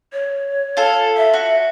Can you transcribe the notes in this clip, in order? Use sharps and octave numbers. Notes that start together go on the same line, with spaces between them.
C#5
F4 A4
E5
F#4